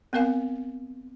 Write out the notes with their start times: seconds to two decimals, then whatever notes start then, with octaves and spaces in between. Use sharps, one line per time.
0.13 B3 C4 A#4 F5 G#5